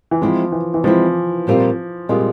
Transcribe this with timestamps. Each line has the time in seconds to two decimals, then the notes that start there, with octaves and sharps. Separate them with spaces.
0.11 E3
0.22 F3 G#3 C4 E4
0.52 E3
0.74 E3
0.84 F3 G#3 C4 E4
1.47 A#2 G3 C4 F4 A#4
2.09 A#2 G3 G#3 C4 F4 A#4